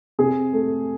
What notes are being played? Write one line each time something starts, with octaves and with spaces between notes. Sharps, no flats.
C3 G#4
A3